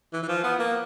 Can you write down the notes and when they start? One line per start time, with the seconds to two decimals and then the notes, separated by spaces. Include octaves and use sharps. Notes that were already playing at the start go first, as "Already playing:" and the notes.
0.13 E3
0.23 E3
0.28 F3
0.43 B3
0.59 A#3